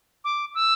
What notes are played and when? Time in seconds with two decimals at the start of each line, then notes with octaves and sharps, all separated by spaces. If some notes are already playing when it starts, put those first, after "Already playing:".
0.24 D6
0.55 E6